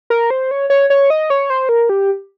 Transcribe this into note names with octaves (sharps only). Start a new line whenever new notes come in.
A#4
C5
C#5
C#5
C#5
D#5
C#5
C5
A#4
G4